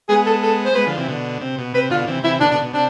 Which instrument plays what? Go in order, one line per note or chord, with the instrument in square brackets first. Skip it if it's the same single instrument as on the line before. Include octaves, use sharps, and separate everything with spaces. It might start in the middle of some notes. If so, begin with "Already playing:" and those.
[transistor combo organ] G#3 B3 [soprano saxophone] G#4
[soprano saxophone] A4
A4
C5
[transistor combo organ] G#3 B3 [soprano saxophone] B4
[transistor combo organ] D3 F3
C3 E3
B2 D3
C3
B2
[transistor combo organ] C3 [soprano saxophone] B4
[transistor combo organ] B2 D3 [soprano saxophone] F4
[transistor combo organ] C3 E3
[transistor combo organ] C3 E3 [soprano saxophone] E4
[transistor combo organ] B2 D3 [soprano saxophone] D4
[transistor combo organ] B2 D3 [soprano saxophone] D4
[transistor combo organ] B2
[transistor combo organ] C3 [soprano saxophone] D4